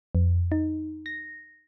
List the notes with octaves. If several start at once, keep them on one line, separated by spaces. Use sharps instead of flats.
F2
D#4
A#6